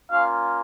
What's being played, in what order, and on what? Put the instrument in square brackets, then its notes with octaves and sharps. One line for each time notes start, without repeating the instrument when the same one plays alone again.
[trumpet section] A#3 C#4 F4 F5